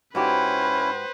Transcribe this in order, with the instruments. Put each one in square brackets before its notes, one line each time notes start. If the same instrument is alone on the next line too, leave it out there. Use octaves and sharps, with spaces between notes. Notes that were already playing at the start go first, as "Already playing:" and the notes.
[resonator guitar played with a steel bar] G#2 F#4 G4 [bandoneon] C#4 E4 [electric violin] B4 C5